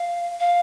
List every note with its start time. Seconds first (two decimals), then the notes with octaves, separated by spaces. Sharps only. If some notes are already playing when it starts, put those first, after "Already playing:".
Already playing: F5
0.40 F5